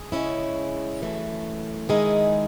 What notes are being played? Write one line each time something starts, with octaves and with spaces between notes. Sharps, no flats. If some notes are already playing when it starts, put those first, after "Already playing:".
Already playing: G#4
C#3 G#3 C#4 E4
F#2 E3 A3
D#3 G#3 D#4 E4 G#4